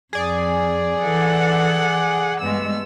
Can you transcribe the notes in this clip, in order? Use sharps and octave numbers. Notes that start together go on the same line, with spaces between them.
F2 G#4 D5
E3 A4 F#5
G2 G#3 A3 B3 E6